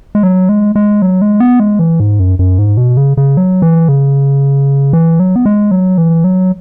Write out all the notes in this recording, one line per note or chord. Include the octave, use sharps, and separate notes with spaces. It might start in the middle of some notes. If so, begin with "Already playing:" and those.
G#3
F#3
G#3
G#3
F#3
G#3
B3
G#3
E3
G#2
F#2
F#2
G#2
B2
C#3
C#3
F#3
E3
C#3
E3
F#3
B3
G#3
F#3
E3
F#3